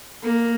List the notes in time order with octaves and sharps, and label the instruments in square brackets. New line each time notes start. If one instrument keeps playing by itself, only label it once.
[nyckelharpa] A#3